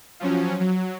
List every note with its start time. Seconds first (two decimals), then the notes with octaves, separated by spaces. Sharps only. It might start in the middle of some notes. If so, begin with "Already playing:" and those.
0.20 F3 F#3 C#4
0.60 F#3